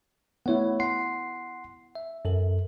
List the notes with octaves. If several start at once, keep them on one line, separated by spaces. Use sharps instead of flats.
A3 B3 E4 C#5 F#5
F#5 C6 C7
E5
F#2 A4 A#4